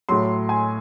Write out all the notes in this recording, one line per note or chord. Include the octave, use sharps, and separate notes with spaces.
A2 F#3 C6
G#5